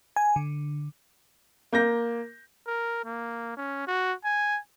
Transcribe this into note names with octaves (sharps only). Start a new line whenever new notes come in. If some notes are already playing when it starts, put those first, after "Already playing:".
G#5
D3
A#3 G6 A#6
A#4
A#3
C#4
F#4
G#5